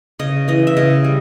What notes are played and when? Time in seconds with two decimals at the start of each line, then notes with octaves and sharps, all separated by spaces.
0.19 C#3 D#5
0.48 E3 D#5
0.67 E5
0.77 C#3 D#5
1.04 G3